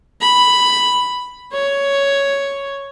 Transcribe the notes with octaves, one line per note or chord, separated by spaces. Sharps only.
B5
C#5